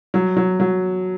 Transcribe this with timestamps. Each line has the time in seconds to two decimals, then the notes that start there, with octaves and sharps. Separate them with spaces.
0.14 F#3
0.37 F#3
0.60 F#3